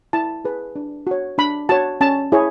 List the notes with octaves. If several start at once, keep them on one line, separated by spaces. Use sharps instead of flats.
E4 A5
G#4 B4
D4
F#4 C#5
D4 B5
F#4 C#5 A5
C#4 A5
E4 G#4 C#5